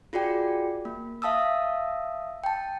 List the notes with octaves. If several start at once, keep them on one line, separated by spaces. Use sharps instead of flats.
F4 F#4 G#4 D5 G5
A#3
E5 F5 A5 D#6 E6
G5 A5